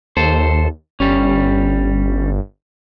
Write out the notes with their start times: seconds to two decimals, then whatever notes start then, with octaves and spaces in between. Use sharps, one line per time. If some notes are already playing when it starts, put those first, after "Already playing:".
0.17 D#2 A4 C5
1.00 G1 G3 C#4